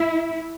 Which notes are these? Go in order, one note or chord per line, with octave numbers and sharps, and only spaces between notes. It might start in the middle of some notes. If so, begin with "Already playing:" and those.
Already playing: E4